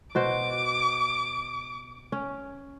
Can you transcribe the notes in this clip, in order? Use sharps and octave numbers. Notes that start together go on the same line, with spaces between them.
B2 F#4 C5 D6
C#4